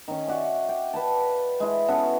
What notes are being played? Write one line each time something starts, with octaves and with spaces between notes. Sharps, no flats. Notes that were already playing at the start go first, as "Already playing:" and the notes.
D#3 C#4
F#4 D5 E5
G5
B4 G5 A5
G#3 E4
B3 C#4 F#4 A4